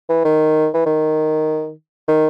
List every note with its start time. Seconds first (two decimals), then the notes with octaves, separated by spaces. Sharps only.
0.09 E3
0.25 D#3
0.74 E3
0.86 D#3
2.08 D#3